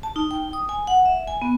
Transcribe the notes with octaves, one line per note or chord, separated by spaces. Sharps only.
A5
D#4
G5
D#6
G#5
F#5
E5
G#5
B3